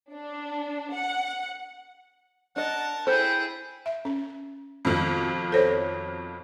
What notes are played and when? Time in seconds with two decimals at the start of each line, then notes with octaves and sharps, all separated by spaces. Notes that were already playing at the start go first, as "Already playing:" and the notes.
0.12 D4
0.94 F#5
2.56 D4 A#4 D#5 F#5 A5
3.07 E4 G#4 A4 C5 G5
3.86 E5
4.05 C#4
4.85 F2 B2 D#3
5.52 A4 C5 C#5